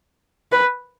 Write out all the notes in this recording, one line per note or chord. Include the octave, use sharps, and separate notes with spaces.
B4